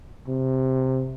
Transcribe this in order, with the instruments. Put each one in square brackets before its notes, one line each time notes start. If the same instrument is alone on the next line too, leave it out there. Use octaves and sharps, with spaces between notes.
[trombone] C3